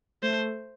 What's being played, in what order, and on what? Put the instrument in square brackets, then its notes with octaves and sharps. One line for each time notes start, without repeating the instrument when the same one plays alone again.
[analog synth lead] A3 [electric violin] C5